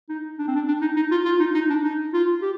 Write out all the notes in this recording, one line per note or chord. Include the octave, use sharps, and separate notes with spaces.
D#4
D4
C4
D4
D4
D#4
D#4
F4
F4
D#4
D#4
D4
D#4
F4
G4